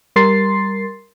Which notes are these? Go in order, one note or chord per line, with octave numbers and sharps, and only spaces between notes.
G3 A#4 C6 A6 C7